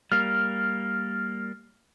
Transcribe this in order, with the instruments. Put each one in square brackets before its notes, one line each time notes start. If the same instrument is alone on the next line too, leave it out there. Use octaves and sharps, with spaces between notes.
[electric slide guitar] G3 A#3 [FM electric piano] F6